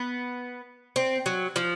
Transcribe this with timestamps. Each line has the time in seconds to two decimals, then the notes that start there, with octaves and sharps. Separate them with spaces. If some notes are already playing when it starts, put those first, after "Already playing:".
Already playing: B3
0.96 C4
1.26 F#3
1.56 F3